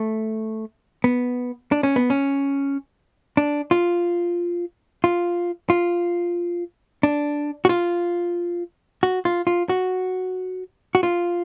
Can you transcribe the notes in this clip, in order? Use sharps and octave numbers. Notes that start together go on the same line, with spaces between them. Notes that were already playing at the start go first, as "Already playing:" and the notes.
Already playing: A3
B3
D4
C#4
B3
C#4
D4
F4
F4
F4
D4
F#4
F4
F#4
F4
F4
F#4
F#4
F4